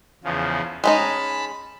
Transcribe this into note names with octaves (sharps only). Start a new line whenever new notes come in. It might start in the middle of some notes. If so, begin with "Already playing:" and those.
E2 C#3 F3
G#3 C#4 D#4 A5 B5